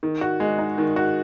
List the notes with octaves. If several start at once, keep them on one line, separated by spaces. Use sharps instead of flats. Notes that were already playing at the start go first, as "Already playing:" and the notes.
D#3
F#4
G#3
D#4
D#3
F#4